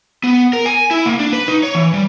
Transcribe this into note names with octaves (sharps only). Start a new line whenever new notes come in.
B3
A#4
G#5
E4
A#3
D4
B4
D#4
C#5
E3
G3